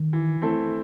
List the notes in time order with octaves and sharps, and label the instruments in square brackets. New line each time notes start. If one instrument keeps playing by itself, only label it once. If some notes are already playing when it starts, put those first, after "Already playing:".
Already playing: [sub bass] D#3
[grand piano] E3
A3 C4 E4 A4